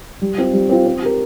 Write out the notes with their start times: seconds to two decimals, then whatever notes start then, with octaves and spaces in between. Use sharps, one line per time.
0.21 G3
0.38 C4 F4
0.53 G3
0.69 C4 F4
0.86 C4
1.02 G4 A#4